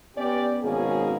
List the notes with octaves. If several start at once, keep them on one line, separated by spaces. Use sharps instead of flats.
B3 C#4 G4 D5
G#1 B2 A#3 C#4 G#4